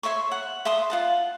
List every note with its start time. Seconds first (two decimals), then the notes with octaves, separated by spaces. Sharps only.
0.03 C#5 E5 C6 C#6
0.32 F#5
0.65 E5 A5 C6 D#6
0.90 F4 F#5 A5